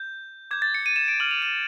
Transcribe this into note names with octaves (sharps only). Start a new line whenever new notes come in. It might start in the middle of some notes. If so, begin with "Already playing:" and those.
Already playing: G6
D6 G6 G#6
A6
C#7
D#7
E7
D7
D6 F6 F#7
F7
D#7